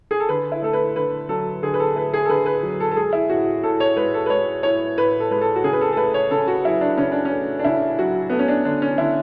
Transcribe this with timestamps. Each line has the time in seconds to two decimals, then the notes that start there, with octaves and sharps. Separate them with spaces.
0.11 G#4
0.20 A4
0.29 D3 B4
0.52 E4
0.62 A3 A4
0.73 B4
0.96 D3 B4
1.29 F#3 A4
1.63 D3 G#4
1.74 B4
1.80 A4
1.96 A3 B4
2.14 G#4
2.25 A4
2.29 D3 B4
2.46 B4
2.63 F#3
2.80 A4
2.91 A4
2.96 G#3 G#4
3.13 E4
3.30 A2 F#4
3.63 A2 A4
3.80 C#5
3.96 G#3 B4
4.14 A4
4.26 B4
4.30 G#3 C#5
4.63 A2 C#5
4.97 A2 B4
5.20 A4
5.31 G#3 B4
5.41 A4
5.56 F#4
5.64 C#3 G#4
5.73 B4
5.81 A4
5.93 A4
5.97 A3 B4
6.14 C#5
6.31 C#3 A4
6.48 F#4
6.65 F#3 E4
6.81 D4
6.98 C#3 C#4
7.12 D4
7.25 C#4
7.32 A3
7.59 D4
7.65 C#3 E4
7.99 F#3 F#4
8.30 A3 B3
8.39 C#4
8.48 D4
8.65 D3 D4
8.82 C#4
8.98 D3 E4